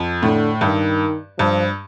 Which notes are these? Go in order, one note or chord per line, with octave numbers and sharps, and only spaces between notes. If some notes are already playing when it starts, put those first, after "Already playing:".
Already playing: F2
A2 D3
G2 D#3
G2 F3